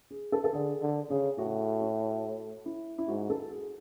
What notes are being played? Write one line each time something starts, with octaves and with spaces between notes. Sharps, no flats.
G#4
A4
A4
D3 G#4
D3
C#3 G#4
A2 F#4
F#4
E4
E4
G#2 F#4
A4
G#4